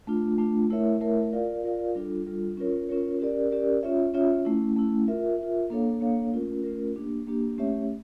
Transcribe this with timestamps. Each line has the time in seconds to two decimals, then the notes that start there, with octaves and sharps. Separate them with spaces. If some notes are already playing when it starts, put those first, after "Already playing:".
0.07 A3 D4 F4
0.38 A3 D4 F4
0.70 A3 E4 A#4 C#5 E5
1.01 A3 E4 A#4 C#5 E5
1.33 F4 A#4 D5 F5
1.64 F4 A#4 D5 F5
1.95 G3 D4 F4 A4
2.27 G3 D4 F4 A4
2.57 C#4 F4 A#4 C#5
2.89 C#4 F4 A#4 C#5
3.20 C#4 G4 A#4 D5
3.51 C#4 G4 A#4 D5
3.83 C#4 F4 C#5 E5
4.14 C#4 F4 C#5 E5
4.45 A3 C#4 E4
4.77 A3 C#4 E4
5.08 F4 A#4 E5
5.39 F4 A#4 E5
5.70 A#3 D4 A4 C#5 F5
6.01 A#3 D4 A4 C#5 F5
6.32 A3 C#4 F4 A#4
6.63 A3 C#4 F4 A#4
6.95 A#3 D4 G4
7.27 A#3 D4 G4
7.58 A3 C#4 G4 C#5 E5